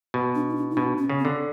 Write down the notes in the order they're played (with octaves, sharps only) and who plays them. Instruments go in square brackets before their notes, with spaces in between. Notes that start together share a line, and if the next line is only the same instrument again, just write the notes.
[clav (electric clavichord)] B2
[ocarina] D4
D#4
D4
D#4
[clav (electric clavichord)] B2 [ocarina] D4
[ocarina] C#4
[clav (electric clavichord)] C#3
[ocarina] C4
[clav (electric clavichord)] D3